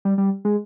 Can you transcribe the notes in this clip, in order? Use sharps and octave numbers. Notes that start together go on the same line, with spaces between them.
G3
G3
G#3